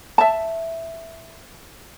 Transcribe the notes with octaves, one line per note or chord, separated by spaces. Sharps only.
E5 A5